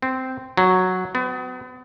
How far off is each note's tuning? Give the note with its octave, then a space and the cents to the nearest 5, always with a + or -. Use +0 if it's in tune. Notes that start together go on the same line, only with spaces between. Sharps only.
C4 -10
F#3 -5
B3 +40